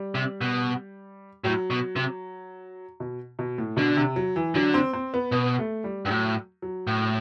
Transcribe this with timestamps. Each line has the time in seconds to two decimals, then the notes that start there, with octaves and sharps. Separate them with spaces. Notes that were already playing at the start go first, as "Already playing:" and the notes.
Already playing: G3
0.15 C3
0.41 B2
1.44 A2 F#3
1.70 B2
1.96 C3
3.00 B2
3.39 B2
3.58 A2
3.77 B2 D3
3.96 C3
4.16 F#3
4.36 E3
4.55 D3 F#3
4.74 C4
4.93 C4
5.14 B3
5.32 B2 B3
5.59 A3
5.84 G3
6.05 G2
6.10 A2 F#3
6.62 F#3
6.87 A2